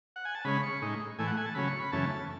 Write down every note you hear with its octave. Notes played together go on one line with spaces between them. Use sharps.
F#5
G#5
A5
C#3 G#3 C#4 B5
C#6
A2 G#3 D#4
A2 E3 A3 G#5
F#5
G#5
A5
C#3 F#3 C#4 B5
C#6
B5
F#2 C#3 E3 A3 C#4 A5